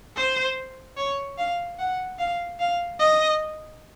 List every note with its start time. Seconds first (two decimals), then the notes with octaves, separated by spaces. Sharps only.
0.16 C5
0.97 C#5
1.38 F5
1.79 F#5
2.19 F5
2.60 F5
3.00 D#5